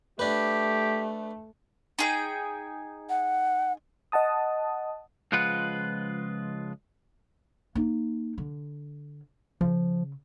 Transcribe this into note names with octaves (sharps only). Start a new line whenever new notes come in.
A3 D4 G4 B4
D#4 G#4 G5
F#5
D#5 F#5 A5 D#6
C#2 F3 G#3 F4 B4 F#5
A#3 D#4
D3
C#3 F3